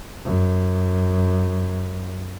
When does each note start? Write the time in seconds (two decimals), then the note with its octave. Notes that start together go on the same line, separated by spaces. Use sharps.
0.24 F#2